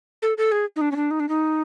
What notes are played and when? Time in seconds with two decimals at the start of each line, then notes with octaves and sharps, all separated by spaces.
0.22 A4
0.38 A4
0.52 G#4
0.76 D#4
0.81 D4
0.92 C#4
0.96 D4
1.11 D#4
1.20 D4
1.29 D#4